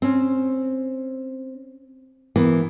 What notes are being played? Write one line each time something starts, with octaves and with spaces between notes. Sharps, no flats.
C4 C#4
E3 A#3 B3